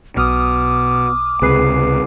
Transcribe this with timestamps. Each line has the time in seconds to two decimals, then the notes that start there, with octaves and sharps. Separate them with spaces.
0.17 B1 B2 D6 D#6 F6
1.42 C#2 C3 G#4 B4 C7